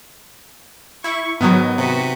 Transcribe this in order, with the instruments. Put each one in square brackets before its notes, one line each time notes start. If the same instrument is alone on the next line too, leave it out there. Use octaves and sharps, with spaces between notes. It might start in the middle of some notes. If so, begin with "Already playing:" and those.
[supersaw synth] E4 [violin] C#6
[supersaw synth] G#2 D#3 F#3 [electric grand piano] B3 [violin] D#5
[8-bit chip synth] C3 [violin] F#4 B4